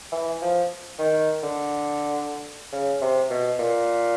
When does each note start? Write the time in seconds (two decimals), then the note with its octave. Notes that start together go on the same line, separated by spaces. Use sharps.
0.12 E3
0.42 F3
0.99 D#3
1.43 D3
2.72 C#3
3.01 C3
3.30 B2
3.59 A#2